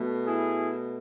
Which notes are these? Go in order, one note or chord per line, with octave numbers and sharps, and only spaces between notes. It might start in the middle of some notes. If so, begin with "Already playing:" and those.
Already playing: B2 A3
E4 G#4